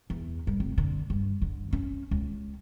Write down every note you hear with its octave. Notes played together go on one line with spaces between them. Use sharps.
E2
G2
F1
D3
G2
D3
C#4
C#2